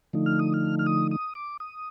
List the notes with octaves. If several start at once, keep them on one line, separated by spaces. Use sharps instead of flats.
D3 F3 A3 D#4
F6
D#6
F6
F6
D#6
D#6
D6
D#6